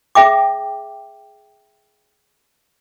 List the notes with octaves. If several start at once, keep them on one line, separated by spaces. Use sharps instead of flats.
G#4 E5 G5 D6